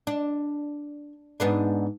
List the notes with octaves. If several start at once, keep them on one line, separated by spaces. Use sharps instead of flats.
D4
G#2 B3 D4